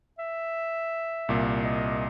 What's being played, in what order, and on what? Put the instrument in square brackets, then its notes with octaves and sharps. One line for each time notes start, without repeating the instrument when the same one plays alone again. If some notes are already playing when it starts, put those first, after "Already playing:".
[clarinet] E5
[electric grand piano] C2 A#2
[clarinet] D#5